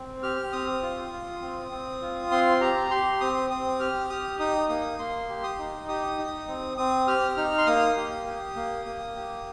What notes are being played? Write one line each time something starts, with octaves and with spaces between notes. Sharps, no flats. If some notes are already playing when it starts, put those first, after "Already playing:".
Already playing: C4
G4 F6
C4 D#6
F4
F4
C4
C4
F4
C4 C6
G4 A#5
G4 C6
C4 D#6
C4 D#6
G4 F6
G4 D#6
D#4 D#6
A#3 D#6
A#3 C6
G4
D#6
D#4
G4 D#6
D#4
C4
C4 D#6
G4 F6
D#4 F6
C6
A#3 D#6
G4
G4
A#3
A#3
G4